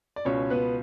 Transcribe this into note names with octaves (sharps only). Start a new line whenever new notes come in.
D5
C#2 B2 C#4 C#5
B3 B4